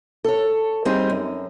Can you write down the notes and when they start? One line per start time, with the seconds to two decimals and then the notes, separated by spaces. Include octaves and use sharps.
0.24 A4 C#5
0.85 G3 C4 D#4 G#4
1.10 F#2